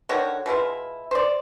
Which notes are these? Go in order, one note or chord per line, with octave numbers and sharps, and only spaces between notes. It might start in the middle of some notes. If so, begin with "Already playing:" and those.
D3 D#3 F#4 C#5
B2 G#3 E4 F4
C5 D5